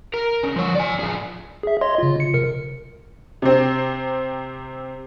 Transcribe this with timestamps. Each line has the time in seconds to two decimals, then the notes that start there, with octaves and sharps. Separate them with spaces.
0.14 A#4
0.44 C#3
0.56 F3 C#5
0.75 D5 G#5
1.00 F3 G#4
1.63 G#4 E5
1.81 C#5 D#5 C6
1.98 C#3 F4
2.20 C#7
2.34 C3 A#4
3.42 C3 C4